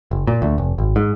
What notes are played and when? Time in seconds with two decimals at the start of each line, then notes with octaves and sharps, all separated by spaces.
0.11 F#1
0.27 A#2
0.42 D2
0.58 F1
0.78 G#1
0.96 G#2